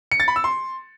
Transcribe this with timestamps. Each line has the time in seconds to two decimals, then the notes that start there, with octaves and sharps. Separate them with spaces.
0.12 C#7
0.20 A6
0.28 B5
0.36 E6
0.44 C6